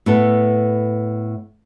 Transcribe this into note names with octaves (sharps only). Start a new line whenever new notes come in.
A2 B3 A4